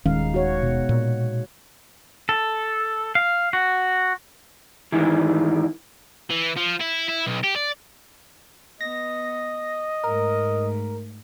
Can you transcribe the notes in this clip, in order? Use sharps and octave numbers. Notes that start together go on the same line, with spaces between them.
D#1 D#3 G#3 C#4 D#4 F5
F#4 C#5
B2
A#2
A4
F5
F#4
G#2 D#3 E3
E3
F3
E4
E4
B1
G4
D5
B3 D#5 A#6
G#2 A3 A#4